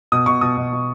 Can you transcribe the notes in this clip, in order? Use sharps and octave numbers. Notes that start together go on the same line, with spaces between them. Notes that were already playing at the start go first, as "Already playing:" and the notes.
B2 D#6
B2 C#6
B2 D#6
B2
B2